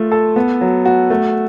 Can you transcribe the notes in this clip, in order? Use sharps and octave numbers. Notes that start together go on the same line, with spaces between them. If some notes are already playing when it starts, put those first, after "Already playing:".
Already playing: A3 F4
A4
B3
F#3
F#4
A3